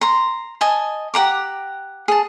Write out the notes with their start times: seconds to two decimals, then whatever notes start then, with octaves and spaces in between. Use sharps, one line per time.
0.01 A#5 C6
0.61 D#5 G#5 A5
1.14 G4 F#5 A#5 D6
2.08 G#4 A5